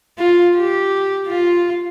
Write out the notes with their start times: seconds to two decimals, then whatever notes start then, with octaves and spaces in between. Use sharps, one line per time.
0.18 F4
0.57 G4
1.27 F4